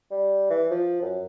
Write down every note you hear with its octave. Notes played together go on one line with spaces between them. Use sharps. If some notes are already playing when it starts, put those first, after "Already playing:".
G3
E3
F3
F#2